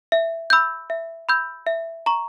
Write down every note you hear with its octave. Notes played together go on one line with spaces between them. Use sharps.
E5
B5 E6 G6
E5
B5 E6 G6
E5
A#5 C#6